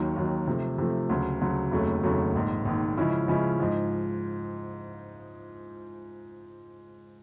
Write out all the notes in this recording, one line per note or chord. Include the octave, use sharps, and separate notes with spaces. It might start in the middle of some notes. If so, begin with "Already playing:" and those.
Already playing: D#2 D#3 F#3
D#2 D#3 F#3
C3 F3 A3
C3 F3 A3
D2 C#3 F#3
D2 C#3 F#3
F1 D#2 C#3 F#3 A3
F1 D#2 C#3 F#3 A3
A#1 G#2 D#3
A#1 G#2 D#3
C#3 F3 G#3 C#4 E4
C#3 F3 G#3 C#4 E4
G#2 F3 G#3